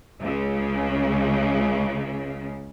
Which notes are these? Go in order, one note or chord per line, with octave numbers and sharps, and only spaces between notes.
C#2 C#3